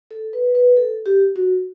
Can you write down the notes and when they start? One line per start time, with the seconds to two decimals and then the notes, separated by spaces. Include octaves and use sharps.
0.11 A4
0.33 B4
0.55 B4
0.77 A4
1.06 G4
1.36 F#4